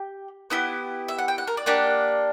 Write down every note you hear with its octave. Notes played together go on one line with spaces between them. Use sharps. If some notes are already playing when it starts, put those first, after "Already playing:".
Already playing: G4
B3 E4 G4
E5
F#5
G5
F#5
A#4
D5
A#3 D4 G4 F#5